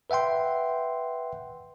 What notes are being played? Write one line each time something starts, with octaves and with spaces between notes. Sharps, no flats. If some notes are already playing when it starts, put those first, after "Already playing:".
B4 E5 F#5 G5 C6